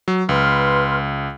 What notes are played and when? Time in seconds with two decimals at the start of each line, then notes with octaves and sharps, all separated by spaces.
0.08 F#3
0.29 C#2 B4 C6 F6